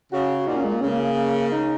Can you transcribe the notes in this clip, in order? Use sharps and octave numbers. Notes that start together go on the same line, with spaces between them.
C#3 F#4
A#2 D#4
C#4
G#3
A#3
C#3 C#4
A#3
D#4